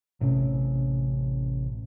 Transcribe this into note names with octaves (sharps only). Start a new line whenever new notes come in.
A1 C3 C#4